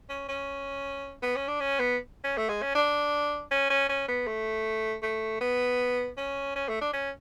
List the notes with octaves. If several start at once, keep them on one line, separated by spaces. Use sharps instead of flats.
C#4
C#4
B3
C#4
D4
C#4
B3
C#4
A3
G#3
C#4
D4
C#4
C#4
C#4
B3
A3
A3
B3
C#4
C#4
A3
D4
C#4